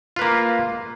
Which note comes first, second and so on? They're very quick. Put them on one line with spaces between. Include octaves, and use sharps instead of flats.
F4 B4 A#3